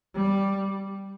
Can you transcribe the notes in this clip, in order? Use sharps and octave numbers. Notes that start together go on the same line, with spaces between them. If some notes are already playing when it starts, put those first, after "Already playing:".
G3